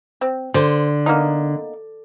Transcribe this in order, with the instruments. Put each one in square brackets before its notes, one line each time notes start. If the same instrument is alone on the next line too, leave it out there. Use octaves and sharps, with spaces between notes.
[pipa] C4
[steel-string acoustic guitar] D3 [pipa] C5
[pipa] A#3 B3 D#4